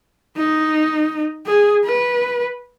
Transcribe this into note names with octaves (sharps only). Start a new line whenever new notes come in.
D#4
G#4
B4